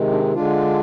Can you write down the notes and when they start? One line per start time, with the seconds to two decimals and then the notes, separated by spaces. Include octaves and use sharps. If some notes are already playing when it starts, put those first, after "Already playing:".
Already playing: C3 D#3 G#3
0.12 D4
0.34 D3 G#3 D4 F4